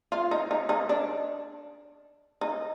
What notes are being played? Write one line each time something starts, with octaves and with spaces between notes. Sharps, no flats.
F4
D#4
D#4
D#4
D4
D#4